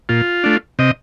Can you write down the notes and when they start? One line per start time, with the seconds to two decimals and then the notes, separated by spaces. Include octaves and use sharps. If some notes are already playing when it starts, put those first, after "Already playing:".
0.09 A#2 F4
0.44 A3 D4
0.79 C3 D#5